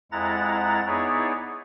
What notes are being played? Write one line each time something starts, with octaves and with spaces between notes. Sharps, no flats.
F2 G#3 E4 F#5 A#5 A6
B3 D#4 E4 G#4 C#5 D5